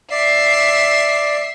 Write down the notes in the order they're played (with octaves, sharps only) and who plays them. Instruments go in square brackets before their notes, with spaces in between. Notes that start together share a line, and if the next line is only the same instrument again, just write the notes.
[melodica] D5 [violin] E5 C7